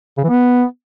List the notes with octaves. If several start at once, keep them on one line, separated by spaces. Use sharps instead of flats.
C#3
E3
B3